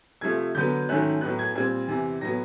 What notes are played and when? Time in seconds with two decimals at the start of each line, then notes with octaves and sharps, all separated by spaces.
0.21 C3 F3 A3 G#6
0.55 D3 F#3 B3 G6
0.89 G#2 D#3 F#3 A3 C#4 F#6
1.21 A2 F#3 B3 F#6
1.39 G#6
1.55 A#2 G3 C4 G#6
1.88 E2 C3 E3
2.21 A2 F#3 B3 A#6